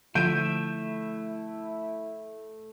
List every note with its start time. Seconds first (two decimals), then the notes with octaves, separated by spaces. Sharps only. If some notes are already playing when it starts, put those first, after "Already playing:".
0.15 D3 F3 A3 E4 E5 G6 D7 D#7